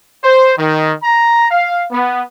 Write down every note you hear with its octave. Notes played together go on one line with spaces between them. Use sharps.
C5
D#3
A#5
F5
B3